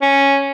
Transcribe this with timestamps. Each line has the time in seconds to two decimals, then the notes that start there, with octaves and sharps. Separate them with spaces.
0.02 C#4